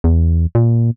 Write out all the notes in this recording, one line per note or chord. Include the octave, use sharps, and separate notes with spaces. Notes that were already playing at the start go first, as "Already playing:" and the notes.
E2
A#2